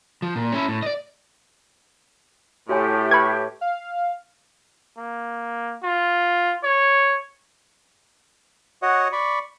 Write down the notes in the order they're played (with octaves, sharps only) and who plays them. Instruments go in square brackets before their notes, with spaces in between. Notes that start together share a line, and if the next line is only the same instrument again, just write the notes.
[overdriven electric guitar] F3
A#2
C#4 E4
A2
D5 D#5
[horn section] A2 [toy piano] F#4 C#5 G#5 [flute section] G4 E5
[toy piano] B4 [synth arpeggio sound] B5 C#6 G#6
[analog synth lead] F5
[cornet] A#3
F4
C#5
[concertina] F#4 C#5 D#5 F#5
D5 B5 C#6